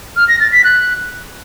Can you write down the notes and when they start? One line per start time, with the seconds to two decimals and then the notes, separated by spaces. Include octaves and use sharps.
0.16 F6
0.28 A#6
0.40 A6
0.52 B6
0.64 F#6